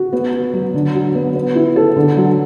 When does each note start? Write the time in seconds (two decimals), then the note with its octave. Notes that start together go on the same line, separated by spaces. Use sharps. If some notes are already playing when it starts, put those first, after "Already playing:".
Already playing: F#4
0.13 B3
0.33 F#4
0.53 F#3
0.74 D3
0.95 F#3
1.15 B3
1.35 B3
1.55 E4
1.76 A4
1.96 D3
2.17 F#3